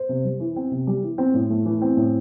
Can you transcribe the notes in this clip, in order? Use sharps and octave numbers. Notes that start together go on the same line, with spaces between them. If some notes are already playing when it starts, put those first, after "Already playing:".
Already playing: C5
C3
G3
E3
C4
C3
G3
E3
C4
A2
A3
E3
C4
A2